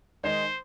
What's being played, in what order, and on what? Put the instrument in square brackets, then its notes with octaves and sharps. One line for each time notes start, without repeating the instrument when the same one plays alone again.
[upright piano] D#3 G#3 D#4 [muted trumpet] C5